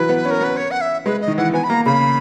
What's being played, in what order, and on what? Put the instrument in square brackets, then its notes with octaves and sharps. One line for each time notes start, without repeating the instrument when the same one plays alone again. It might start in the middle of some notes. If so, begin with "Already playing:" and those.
Already playing: [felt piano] E3 F#3 [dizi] B4
[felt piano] B3
C#4
[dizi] A#4
[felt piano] B3 [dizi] B4
[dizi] C#5
F#5
E5
[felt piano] G#3 [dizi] B4
[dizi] D#5
[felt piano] D#3
[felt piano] E3 [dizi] F#5
[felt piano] B3 [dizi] G#5
[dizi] B5
[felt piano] A#3 [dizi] A#5
[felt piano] C#3 [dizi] B5